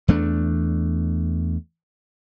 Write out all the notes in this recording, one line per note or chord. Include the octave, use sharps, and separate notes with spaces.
E2 A3 D4